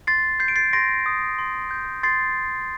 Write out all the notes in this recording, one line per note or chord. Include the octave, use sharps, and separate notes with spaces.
C6 A6 C7
G6 C7
D7
A6 C7
C6 A#6 D7
D#6
C6
G6
C6 A6 C7